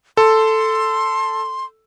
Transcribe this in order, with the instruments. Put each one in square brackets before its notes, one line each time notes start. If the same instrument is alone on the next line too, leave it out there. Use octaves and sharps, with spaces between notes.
[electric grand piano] A4 [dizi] C6